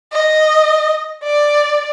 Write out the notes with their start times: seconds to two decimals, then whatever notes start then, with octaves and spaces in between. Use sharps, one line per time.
0.12 D#5
1.23 D5